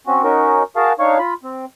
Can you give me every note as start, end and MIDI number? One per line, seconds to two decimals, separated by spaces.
0.07 0.24 60
0.07 0.24 61
0.07 0.24 66
0.24 0.63 61
0.24 0.63 63
0.24 0.63 66
0.24 0.63 70
0.76 0.93 66
0.76 0.93 68
0.76 0.93 70
0.76 0.93 77
0.76 0.93 81
0.99 1.18 62
0.99 1.18 63
0.99 1.18 73
0.99 1.18 77
0.99 1.18 85
1.19 1.34 65
1.19 1.34 83
1.43 1.65 60